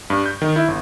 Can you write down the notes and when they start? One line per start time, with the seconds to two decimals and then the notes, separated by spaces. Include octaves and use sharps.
0.10 G2
0.26 G6
0.42 D#3
0.56 E4
0.68 G1